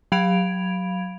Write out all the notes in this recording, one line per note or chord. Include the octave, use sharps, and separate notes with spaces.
F#3 F5 B5 G#6 D7 F7